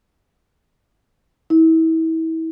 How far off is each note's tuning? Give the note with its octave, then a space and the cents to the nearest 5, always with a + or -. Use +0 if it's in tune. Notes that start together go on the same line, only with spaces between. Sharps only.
E4 -30